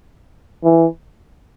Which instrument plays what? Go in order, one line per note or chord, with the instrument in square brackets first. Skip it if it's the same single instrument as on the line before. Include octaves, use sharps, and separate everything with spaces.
[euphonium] E3